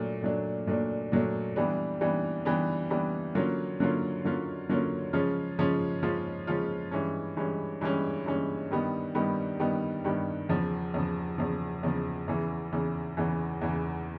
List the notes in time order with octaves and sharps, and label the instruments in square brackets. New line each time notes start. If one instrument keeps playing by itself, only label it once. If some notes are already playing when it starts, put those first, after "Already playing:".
Already playing: [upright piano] A#2 F#3 A3 D4
A#2 F#3 A3 D4
A#2 F#3 A3 D4
A#2 F#3 A3 D4
E3 G3 B3 D4
E3 G3 B3 D4
E3 G3 B3 D4
E3 G3 B3 D4
D3 F#3 A#3 C#4 F4
D3 F#3 A#3 C#4 F4
D3 F#3 A#3 C#4 F4
D3 F#3 A#3 C#4 F4
C#3 F3 G#3 C#4 F4
C#3 F3 G#3 C#4 F4
C#3 F3 G#3 C#4 F4
C#3 F3 G#3 C#4 F4
G2 E3 G#3 C#4
G2 E3 G#3 C#4
G2 E3 G#3 C#4
G2 E3 G#3 C#4
G2 D#3 G3 B3
G2 D#3 G3 B3
G2 D#3 G3 B3
G2 D#3 G3 B3
E2 C#3 F3
E2 C#3 F3
E2 C#3 F3
E2 C#3 F3
E2 C#3 E3
E2 C#3 E3
E2 C#3 E3
E2 C#3 E3